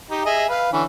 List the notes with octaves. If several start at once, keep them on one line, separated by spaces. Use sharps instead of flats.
D#4 G4
G#4 D#5 E5
B4 F5
D3 E3 C#4